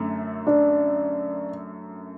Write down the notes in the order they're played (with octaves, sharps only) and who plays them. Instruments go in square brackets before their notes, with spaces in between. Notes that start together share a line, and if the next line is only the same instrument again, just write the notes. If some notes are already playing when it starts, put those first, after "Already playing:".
Already playing: [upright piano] F#2 D3 A3
[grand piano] D4